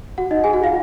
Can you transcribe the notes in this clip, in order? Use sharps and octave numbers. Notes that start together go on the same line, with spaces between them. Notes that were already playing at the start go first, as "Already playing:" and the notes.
F#4 F#5
D#4 D#5
G#4 G#5
F#4 F#5
F4 F5